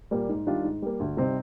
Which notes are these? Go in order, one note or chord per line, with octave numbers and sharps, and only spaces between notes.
A#2 G3 A#3
G#2
D#3 G3 D4 F4
G#2
G3 A#3
D2
C3 G3 C4 D#4